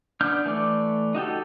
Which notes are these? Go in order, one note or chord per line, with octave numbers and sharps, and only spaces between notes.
B3 D4 F6 G6
E3 A3 D5
D#4 F#4 G4 A4